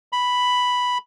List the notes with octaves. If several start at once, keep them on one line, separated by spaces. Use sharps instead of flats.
B5